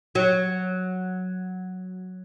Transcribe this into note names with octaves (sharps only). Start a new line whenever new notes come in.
F#3